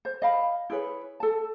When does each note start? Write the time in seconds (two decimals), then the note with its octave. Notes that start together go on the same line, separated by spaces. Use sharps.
0.05 C5
0.22 D#5 F5 B5
0.70 E4 G#4 B4 C#5
1.20 A4 A5